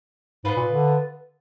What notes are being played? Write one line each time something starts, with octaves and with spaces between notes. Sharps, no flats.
G#2 B3 F4 B4
A#2
D3